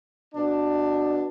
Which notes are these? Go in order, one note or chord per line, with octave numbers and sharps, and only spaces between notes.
B2 D4